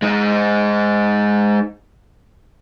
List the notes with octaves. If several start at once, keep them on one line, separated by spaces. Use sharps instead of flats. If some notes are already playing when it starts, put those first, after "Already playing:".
G#3 D#4